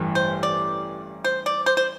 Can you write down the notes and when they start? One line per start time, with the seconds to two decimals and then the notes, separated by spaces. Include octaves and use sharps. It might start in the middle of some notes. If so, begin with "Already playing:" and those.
Already playing: A1 G2 E3 G3
0.15 C5
0.43 D5
1.24 C5
1.46 D5
1.66 C5
1.77 C5